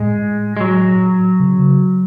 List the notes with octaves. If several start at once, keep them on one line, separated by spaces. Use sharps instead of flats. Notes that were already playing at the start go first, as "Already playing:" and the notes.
Already playing: A2 G#3
G#3
F#3
C#3